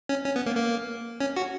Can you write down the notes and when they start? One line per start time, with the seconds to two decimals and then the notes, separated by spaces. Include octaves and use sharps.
0.09 C#4
0.25 C#4
0.36 B3
0.46 A#3
0.57 A#3
1.20 C#4
1.36 F#4